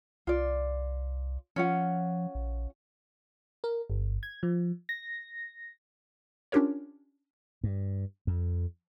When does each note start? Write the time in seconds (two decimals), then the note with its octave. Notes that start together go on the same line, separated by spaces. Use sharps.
0.27 C2 F4 D5
1.56 F3 C#4 F4 F#5
2.35 A#1
3.64 A#4
3.90 G1
4.23 G#6
4.43 F3
4.89 A#6
6.52 C#4 D4 F4 G4 A#4 C#5
7.64 G2
8.27 F2